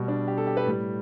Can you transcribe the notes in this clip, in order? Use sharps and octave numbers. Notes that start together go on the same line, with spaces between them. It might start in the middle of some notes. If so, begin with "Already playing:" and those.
Already playing: B2 G3
D4
G4
A4
G4
B4
A2 G3